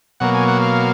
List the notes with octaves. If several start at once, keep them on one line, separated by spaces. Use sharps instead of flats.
B2 F#3 A#3 F#5
G#5
F#5
F5